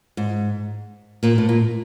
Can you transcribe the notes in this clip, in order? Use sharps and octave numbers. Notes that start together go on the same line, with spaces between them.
G#2
A#2
A2
A#2